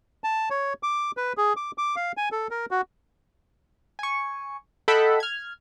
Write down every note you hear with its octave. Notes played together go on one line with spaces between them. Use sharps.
A5
C#5
D6
B4
G#4
D6
D6
F5
G#5
A4
A#4
F#4
G#5 C#6
A4 D#5 E5 F#5 G5 B5
F6 G#6